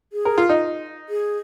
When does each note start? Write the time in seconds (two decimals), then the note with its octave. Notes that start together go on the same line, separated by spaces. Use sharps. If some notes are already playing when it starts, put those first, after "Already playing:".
0.13 G#4
0.25 A#4
0.38 F4
0.49 D#4
1.09 G#4